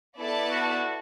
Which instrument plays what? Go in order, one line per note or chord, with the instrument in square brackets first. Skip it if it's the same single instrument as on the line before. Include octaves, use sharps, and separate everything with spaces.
[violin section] B3 E4 A4 D5 A5
[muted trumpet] F#4